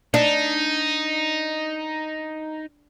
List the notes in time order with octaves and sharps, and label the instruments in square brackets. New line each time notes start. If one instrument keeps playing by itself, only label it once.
[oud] D4 [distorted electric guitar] D#4